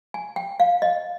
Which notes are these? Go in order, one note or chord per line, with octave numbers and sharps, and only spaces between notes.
G#5
G5
F5
D#5